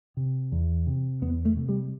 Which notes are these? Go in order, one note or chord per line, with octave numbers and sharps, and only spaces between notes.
C3
E2
C3
E2 B3
A3
C3
G3